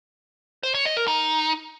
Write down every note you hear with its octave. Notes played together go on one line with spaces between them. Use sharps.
C5
C#5
D#5
A#4
D#4